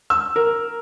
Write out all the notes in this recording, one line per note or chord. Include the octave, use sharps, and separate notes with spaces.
E6
A#4